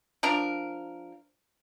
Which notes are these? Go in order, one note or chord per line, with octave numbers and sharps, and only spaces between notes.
F3 D4 A#4